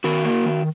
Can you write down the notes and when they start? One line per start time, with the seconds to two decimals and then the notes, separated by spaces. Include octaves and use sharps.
0.04 D#3 F#4 A#4
0.25 A#3
0.46 D#3